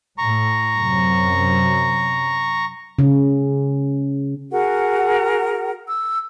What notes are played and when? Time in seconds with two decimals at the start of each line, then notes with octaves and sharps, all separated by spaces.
0.18 A2 A#5 C#6
0.76 F#2 C3 F#3
2.99 C#3
4.52 F#4 G#4 A#4 F#5
5.88 E6